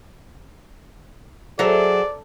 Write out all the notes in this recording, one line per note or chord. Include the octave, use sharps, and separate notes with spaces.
F#3 F#4 G#4 A4 C5 D5 E5 A#5